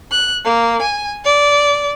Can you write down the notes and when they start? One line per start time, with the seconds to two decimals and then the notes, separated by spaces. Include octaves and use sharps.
0.11 F#6
0.44 A#3
0.80 G#5
1.23 D5